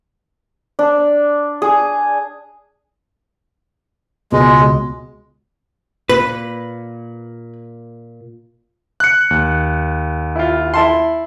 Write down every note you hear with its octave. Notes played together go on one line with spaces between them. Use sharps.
D4
G#4
C#2 B2 G#3
A#2 B4
F#6 C#7
D#2
E4 F4
E4 A5 C6